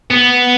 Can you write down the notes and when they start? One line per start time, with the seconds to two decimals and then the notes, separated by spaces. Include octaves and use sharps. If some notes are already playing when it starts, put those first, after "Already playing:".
0.10 B3